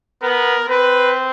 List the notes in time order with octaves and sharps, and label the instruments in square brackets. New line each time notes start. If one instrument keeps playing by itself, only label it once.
[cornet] B3 [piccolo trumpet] A#4
[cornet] C4 [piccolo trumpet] B4